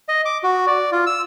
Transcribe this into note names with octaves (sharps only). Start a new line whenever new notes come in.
D#5
D6
F#4
D5
F4
E6